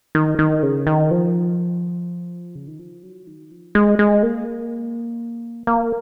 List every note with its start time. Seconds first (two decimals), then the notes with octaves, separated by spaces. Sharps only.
0.15 D#3
0.39 D#3
0.63 C#3
0.87 D#3
1.11 F3
2.55 C#3
2.67 D#3
2.79 F3
3.03 F#3
3.27 D#3
3.51 F3
3.75 G#3
3.99 G#3
4.23 A#3
5.67 A#3